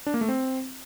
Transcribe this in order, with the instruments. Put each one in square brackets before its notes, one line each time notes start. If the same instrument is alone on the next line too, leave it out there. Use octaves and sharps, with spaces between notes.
[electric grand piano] D4
A#3
A3
C4